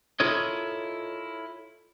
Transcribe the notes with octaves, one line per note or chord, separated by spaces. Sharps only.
E4 F4 A4 A#4 C#5 D#5